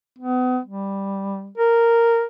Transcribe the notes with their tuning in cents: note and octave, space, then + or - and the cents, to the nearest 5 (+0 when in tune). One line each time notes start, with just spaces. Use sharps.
B3 +35
G3 +5
A#4 -5